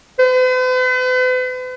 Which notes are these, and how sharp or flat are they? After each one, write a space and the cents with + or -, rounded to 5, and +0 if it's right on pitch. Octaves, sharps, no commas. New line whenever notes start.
B4 +45